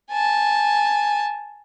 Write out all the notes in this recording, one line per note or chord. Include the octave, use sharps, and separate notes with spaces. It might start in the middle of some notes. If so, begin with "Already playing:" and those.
G#5 A5